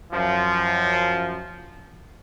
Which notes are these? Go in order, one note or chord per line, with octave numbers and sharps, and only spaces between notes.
F#2 F3